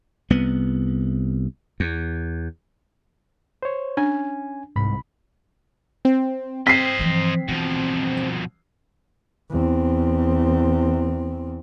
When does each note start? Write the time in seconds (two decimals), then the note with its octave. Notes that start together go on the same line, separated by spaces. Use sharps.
0.30 C2 B3
1.80 E2
3.63 C5 C#5
3.97 C#4 D4 G#5
4.76 C2 G#2 B5
6.05 C4
6.67 C4 C5 D#5 B6 C7
6.99 E3 F3
7.48 B2 E3 F3
9.50 E2 C4